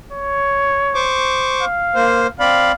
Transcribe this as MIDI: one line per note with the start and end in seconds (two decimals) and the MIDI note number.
0.12 1.09 73
0.95 1.65 72
0.95 1.65 85
0.95 1.65 86
1.63 2.31 77
1.95 2.27 58
1.95 2.27 72
2.40 2.72 60
2.40 2.72 74
2.40 2.74 77
2.40 2.72 83